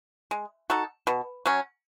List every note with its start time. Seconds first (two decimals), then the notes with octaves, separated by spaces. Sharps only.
0.31 G#3
0.70 D#4 F#4 A4
1.07 B2
1.46 F#3 C#4